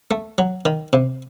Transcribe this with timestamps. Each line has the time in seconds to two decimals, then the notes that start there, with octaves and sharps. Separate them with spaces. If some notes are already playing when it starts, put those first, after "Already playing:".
0.11 A3
0.38 F#3
0.65 D#3
0.93 C3